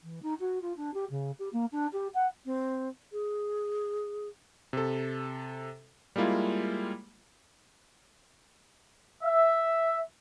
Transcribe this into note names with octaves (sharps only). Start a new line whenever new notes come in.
E3
D#4
F#4
F4
D4
G4
C#3
G4
A#3
D4
G4
F#5
C4
G#4
C3 A4
G3 G#3 A#3 E4 F4
E5